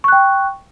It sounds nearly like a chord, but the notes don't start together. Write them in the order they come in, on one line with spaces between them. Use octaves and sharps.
C#6 F#6 G5